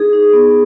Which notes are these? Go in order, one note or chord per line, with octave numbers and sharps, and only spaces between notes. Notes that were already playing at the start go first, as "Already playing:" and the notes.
Already playing: D#4 G#4
D#4
B3